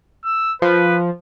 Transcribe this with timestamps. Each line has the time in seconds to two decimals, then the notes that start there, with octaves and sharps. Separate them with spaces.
0.25 E6
0.62 F3 B4